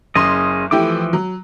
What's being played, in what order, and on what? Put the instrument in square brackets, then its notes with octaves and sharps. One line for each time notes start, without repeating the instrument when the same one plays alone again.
[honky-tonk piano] F#1 C6 D#7 [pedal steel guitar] C#4 G#4 D#5
[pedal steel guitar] E3 F3 D6 [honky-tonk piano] A3 E4 G4
[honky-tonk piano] F#3